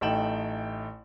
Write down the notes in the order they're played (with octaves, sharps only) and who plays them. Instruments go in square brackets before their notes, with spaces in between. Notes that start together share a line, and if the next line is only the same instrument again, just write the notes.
[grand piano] A1 A3 D#4 G5 E7 F#7